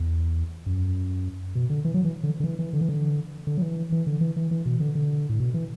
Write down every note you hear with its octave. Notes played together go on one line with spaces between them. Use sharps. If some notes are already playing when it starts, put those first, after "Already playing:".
Already playing: E2
F#2
B2
D3
E3
F#3
E3
D3
D3
E3
E3
D3
E3
D3
D3
F#3
E3
E3
D3
E3
E3
E3
B2
D3
D3
A2
B2
E3